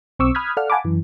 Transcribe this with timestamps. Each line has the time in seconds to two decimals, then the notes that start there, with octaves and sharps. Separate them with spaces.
0.19 B1 C4 C#6 D6 E6
0.35 B5 D#6 F6 F#6 G#6 B6
0.57 A4 D5 F5 F#5 F6
0.70 F5 F#5 G#5 A5 B5 D6
0.85 F#2 E3